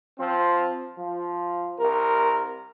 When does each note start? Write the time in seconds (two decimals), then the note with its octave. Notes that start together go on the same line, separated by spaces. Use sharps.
0.19 F3 C4
0.98 F3
1.79 C2 A#4